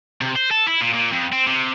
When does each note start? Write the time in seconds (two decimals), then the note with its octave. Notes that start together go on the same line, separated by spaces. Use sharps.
0.21 C3
0.36 C5
0.51 A4
0.68 E4
0.81 A#2
0.94 A#2
1.11 F2
1.33 C4
1.47 C3